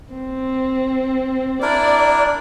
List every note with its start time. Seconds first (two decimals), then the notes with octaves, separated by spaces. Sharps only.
0.13 C4
1.62 D4 E4 A#4 D5